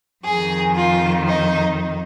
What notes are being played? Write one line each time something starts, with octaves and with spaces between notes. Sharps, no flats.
F2 G#4
D#3
F4
D#4